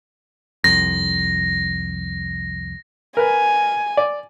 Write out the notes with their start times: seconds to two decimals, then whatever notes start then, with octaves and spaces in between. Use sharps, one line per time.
0.64 C2 F2 A#6
3.17 A#4 B4 G#5
3.97 D5